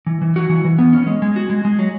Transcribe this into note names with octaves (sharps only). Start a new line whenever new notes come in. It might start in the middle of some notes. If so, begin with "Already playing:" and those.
E3
E3
F#4
E3
E3
B3
C#4
G#3
G#3
F#4
G#3
G#3
F#3